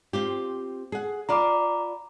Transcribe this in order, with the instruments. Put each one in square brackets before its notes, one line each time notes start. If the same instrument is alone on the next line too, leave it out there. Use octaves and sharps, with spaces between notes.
[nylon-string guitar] C4 F4 G4
G#4 F#5
[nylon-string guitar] F4 D5 F5 [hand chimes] A#5 B5 D6